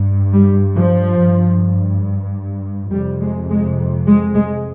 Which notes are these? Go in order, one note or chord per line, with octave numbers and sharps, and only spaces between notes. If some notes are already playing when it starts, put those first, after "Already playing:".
Already playing: G2
G3
F3
G2
F2 C3 G3
G#3
G#3
G#3
G#3